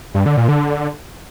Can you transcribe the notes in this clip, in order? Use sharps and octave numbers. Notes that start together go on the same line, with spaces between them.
G2
D3
A#2
D3